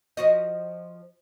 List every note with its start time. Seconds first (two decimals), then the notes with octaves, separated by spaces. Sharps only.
0.17 F3 F#4 D#5